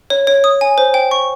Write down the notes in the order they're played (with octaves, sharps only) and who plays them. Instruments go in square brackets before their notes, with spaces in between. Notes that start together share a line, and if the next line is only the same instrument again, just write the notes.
[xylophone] C#5
C#5
D#6
G#5
C5
G5
C#6